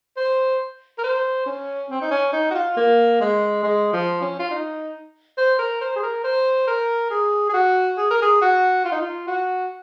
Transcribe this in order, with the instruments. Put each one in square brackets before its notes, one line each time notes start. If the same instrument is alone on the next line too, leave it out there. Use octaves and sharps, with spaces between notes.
[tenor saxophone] C5
A#4
C5
C#4
C4
D#4
C#4
D#4
F#4
F4
A#3
G#3
G#3
F3
C#4
F4
D#4
C5
A#4
C5
G#4
A#4
C5
A#4
G#4
G#4
F#4
G#4
A#4
G#4
F#4
F4
D#4
F4
F#4